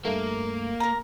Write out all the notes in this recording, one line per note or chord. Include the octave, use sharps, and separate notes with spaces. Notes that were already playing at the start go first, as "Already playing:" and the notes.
G2 A3 A#3
A#4 A#5